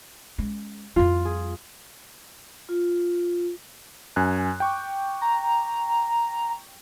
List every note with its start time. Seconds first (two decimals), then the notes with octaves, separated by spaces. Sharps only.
0.38 G#3 C#4
0.96 F2 G3 F4
1.25 G#4
2.69 F4
4.16 F#2 G#5 F#6
4.60 G5 C#6 D6
5.21 A#5